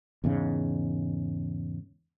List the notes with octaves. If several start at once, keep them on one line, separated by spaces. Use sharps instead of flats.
E2 G#2 C#3